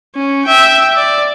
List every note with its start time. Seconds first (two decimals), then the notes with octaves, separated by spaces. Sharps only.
0.15 C#4
0.45 E5 G5
0.96 D5